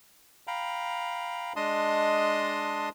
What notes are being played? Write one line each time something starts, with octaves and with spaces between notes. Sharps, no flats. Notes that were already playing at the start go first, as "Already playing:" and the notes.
F5 G5 A#5 B5
G#3 D4 D#5 A5 C6 D#6